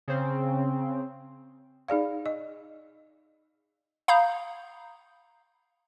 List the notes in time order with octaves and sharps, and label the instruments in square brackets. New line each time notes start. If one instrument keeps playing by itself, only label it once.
[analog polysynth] C#3 C4
[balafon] D#4 G#4 D5 F5
D#5
[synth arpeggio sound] F5 A#5 B5 D#6 G6